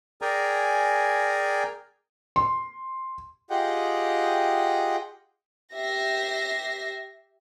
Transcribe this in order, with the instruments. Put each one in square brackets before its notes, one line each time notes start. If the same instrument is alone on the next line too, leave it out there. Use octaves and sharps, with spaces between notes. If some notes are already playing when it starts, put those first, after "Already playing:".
[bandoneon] G#4 A#4 D5 G5 G#5 A#5
[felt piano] C6
[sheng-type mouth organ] F4 G4 G#4 D#5 F#5 G5
[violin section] G4 E5 A#6 C7